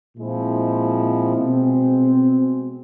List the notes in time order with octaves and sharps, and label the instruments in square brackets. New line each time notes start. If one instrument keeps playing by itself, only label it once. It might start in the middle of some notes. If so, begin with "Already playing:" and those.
[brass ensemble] A#2 F3 G#3 C4 E4
B2 G#3 C4